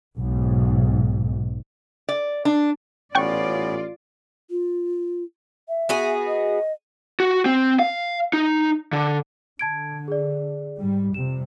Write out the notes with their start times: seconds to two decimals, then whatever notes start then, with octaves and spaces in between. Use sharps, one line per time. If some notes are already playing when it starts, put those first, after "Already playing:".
0.17 B1 G#2
2.09 D5
2.45 D4
3.15 A1 B3 C#4 F4 D5 F#5 G5 C#6
4.50 F4
5.69 E5
5.89 B3 F#4 G#4
6.27 D#5
7.20 F#4
7.46 C4
7.79 F5
8.33 D#4
8.93 D3
9.59 D3 A5 G#6 D7
10.08 G#4 D5
10.81 G#2 G3
11.14 F2 C3 G3 E7